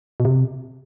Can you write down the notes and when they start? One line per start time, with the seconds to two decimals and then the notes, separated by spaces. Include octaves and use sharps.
0.20 B2
0.25 C3